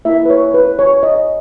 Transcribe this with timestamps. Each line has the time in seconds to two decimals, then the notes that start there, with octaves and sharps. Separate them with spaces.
0.05 A#3 E4 E5
0.25 B4
0.30 C#5
0.54 B4
0.79 C#5
1.03 D#5